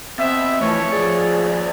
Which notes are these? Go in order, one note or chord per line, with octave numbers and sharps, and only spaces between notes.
B2 C4 E5
F#2 E3 F3 A3 C#5
D#2 F3 G#4 D5